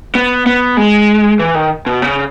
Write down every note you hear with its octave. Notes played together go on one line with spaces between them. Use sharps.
B3
B3
G#3
E3
D#3
B2
C#3